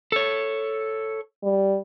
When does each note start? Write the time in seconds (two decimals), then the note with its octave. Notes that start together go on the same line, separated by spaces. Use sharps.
0.12 A4 C#5
1.43 G3